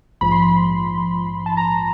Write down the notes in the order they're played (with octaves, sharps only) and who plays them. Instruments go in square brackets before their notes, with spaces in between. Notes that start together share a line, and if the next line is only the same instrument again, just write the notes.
[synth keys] A#1 G#2 F3 B5
C6
B5
A5
A#5